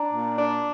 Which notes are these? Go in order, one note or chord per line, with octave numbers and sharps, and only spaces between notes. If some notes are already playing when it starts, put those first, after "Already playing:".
Already playing: D4 A#5 D6
A#2
D4